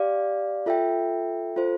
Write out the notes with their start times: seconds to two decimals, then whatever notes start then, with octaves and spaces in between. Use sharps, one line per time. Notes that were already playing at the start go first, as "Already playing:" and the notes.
Already playing: G4 D5 F5
0.66 F4 A4 E5 G5
1.56 F4 A4 C5